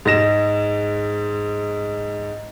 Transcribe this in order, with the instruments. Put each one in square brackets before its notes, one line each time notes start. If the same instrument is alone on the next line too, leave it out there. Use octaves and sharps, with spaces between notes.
[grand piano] G#2 G#3 A#6 E7